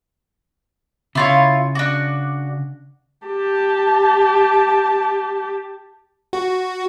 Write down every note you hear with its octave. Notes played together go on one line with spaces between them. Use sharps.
C#3 E4 F4 C#5
D4 F#4
G4 A5
F#4